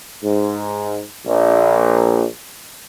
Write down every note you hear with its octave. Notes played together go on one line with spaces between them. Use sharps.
G#2
A#1